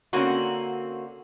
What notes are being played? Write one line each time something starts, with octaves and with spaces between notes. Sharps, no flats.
D3 A#3 C4 C#4 F#4